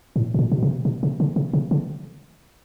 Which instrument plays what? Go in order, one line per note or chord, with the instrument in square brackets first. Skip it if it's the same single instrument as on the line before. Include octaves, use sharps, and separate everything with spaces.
[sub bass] A2
A2
A#2
B2
C3
B2
C3
C#3
C3
C3
C#3